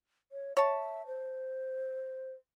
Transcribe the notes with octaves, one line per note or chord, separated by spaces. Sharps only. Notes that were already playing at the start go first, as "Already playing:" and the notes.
C#5
C#5 E5 A5
C5